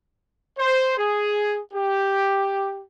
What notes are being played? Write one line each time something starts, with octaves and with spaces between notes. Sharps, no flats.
C5
G#4
G4